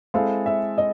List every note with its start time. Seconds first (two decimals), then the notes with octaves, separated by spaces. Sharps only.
0.14 G#3 C4 E4 A4 F5
0.46 E5
0.78 D#5